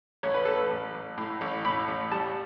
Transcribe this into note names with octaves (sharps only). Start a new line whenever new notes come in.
A1 C#5
B4
A1 A4
B4
A1
A1
A2
A1
A2 B5
A1
G3 A5